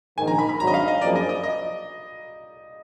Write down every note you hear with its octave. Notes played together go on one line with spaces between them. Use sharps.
A#1 G#2 D#3 G#5
A#5
B5
B5
G#1 G#2 F#3 D4 A#5
D#5
F5
D#5
F#2 F3 A#3 D4 G#4 D5
D#5
D#5
D#5